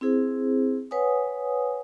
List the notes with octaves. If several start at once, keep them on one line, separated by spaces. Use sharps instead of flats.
C4 E4 G#4 C5
B4 C#5 F#5 G#5 D#6